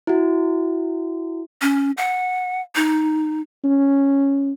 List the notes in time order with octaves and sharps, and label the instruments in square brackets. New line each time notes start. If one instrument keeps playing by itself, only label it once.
[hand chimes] E4 F#4
[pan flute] C#4
F#5
D#4
[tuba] C#4